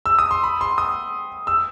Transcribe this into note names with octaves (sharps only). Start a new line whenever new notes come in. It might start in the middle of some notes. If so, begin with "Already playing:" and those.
E6
D#6
C6
B5
C6
D#6
E6